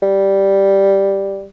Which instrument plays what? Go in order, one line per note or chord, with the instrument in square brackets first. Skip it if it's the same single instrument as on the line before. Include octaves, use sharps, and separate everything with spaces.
[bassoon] G3